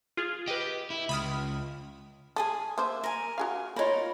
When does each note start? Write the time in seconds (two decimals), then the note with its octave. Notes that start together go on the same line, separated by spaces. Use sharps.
0.17 F4 G#4
0.48 G4 B4 D#5
0.90 E4
1.09 C#2 B5 D#6 F6
2.36 G#4 A4 G#5 D#6
2.78 A#3 C5 E5
3.04 A#4 G#5
3.38 F#4 G#4 F5
3.76 D#4 F4 A#4 C#5 B5